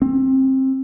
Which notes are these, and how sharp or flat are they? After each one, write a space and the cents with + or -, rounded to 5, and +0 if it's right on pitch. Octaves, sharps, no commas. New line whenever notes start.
C4 +20